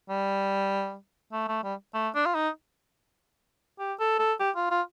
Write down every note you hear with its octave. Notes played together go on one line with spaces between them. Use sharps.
G3
A3
A3
G3
A3
D4
F4
D#4
G4
A4
A4
G4
F4
F4